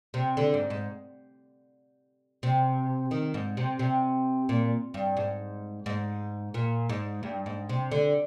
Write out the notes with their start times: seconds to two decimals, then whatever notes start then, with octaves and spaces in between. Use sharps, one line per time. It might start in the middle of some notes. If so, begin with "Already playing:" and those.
0.14 C3
0.37 D3
0.54 G#2
0.70 G#2
2.43 C3
3.11 D#3
3.34 G#2
3.57 C3
3.79 C3
4.49 A#2
4.94 G2
5.17 G#2
5.86 G#2
6.54 A#2
6.89 G#2
7.23 G2
7.46 G#2
7.69 C3
7.91 D3